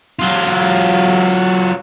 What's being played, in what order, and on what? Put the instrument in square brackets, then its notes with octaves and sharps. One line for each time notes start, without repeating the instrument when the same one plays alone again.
[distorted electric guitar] F#3 F4